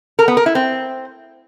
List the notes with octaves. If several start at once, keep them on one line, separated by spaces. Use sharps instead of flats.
A#4
B3
A#4
E4
C4